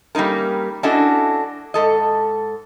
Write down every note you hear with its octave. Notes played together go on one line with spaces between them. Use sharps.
G3 A#3 C#4 D#4 A#4
C#4 D4 E4 F#4 A4 D#5
G#2 A4 D#5